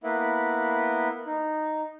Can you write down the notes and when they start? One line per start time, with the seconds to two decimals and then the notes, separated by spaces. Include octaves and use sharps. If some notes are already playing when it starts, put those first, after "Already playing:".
0.04 A#3 B3 E4
1.27 D#4